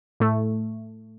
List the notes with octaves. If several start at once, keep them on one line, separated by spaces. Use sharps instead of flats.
A2 A3